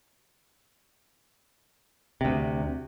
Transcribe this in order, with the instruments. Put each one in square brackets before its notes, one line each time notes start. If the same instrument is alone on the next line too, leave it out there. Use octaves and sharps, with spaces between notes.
[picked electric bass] D2 C3